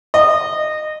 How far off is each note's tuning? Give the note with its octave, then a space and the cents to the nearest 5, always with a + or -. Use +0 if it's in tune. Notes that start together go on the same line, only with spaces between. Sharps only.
D#5 -20